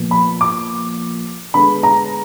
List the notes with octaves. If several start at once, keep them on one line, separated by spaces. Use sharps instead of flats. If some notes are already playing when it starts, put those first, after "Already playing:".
Already playing: A#2 F3 B3
B5
D6
D3 G#3 B3 B5
A#5